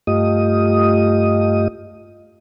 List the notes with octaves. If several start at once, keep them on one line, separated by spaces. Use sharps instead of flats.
G2 A3 F4 G4 D#5 D#6